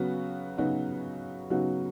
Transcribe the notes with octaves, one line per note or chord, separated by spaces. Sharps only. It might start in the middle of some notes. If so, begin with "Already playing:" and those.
Already playing: C#3 F#3 B3 F#4
C#3 F#3 B3 D#4 F#4
C#3 F#3 B3 D#4 F#4